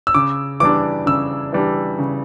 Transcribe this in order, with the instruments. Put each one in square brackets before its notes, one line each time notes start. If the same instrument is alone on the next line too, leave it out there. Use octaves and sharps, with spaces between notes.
[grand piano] E6
C#3 D6
E3 G3 D4 D6
C#3 E6
E3 G3 D4
C#3